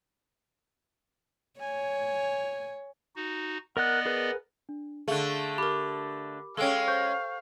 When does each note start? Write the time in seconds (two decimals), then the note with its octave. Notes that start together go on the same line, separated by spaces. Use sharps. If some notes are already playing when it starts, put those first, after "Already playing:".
1.60 C#5 G#5
3.16 D#4 F#4
3.77 B3 A#4 D5 D#5 F#5 F#6
4.06 G#4 A#4 B4
4.69 D4
5.08 D3 A3 G#4 F5 F#7
5.58 G4 A#4 B5 D6
6.57 G#3 C#4 A4 F5 G5
6.88 C5 C#6 G6